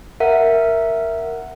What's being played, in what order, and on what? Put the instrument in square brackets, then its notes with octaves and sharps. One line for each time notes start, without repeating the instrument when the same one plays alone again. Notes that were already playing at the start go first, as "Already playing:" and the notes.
[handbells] A#4 E5 F#5